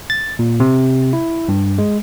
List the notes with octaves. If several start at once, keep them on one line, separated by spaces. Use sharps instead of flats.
A6
A#2
C3
E4
G2
G#3